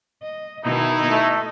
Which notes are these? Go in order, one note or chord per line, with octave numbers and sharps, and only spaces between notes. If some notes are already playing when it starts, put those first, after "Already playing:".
D#5
B2 D#3 D#4 E4
A3 D#5